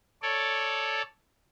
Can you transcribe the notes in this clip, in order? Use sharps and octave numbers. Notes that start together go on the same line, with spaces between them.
A4 C#5 D5